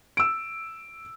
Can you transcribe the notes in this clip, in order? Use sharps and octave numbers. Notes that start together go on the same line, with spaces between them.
E6 D7